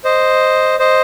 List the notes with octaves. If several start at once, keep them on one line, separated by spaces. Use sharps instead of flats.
C5 D#5
C5 D#5